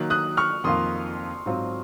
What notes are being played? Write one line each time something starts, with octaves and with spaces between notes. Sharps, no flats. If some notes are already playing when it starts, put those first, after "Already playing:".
Already playing: D#3 F#3 A#3 F#6
D#6 F#6
C#6 F6
F2 D#3 A#3 F4 C6 D#6
G#2 F#3 C4 F4